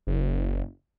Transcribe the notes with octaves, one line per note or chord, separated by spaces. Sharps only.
F#1